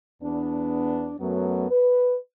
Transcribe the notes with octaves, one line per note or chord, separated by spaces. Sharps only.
E2 B3 D4
F#2 F#3 A3 B3
B4